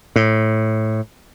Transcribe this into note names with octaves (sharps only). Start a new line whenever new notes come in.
A2